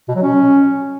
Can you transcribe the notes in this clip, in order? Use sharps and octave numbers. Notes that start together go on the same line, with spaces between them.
B2
F#3
C#4